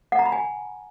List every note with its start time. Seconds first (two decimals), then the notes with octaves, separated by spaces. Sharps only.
0.12 F#5
0.19 A#5
0.26 B5
0.32 G#5